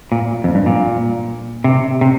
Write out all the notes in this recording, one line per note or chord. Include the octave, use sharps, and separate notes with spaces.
A#2
F2
G2
A#2
C3
C3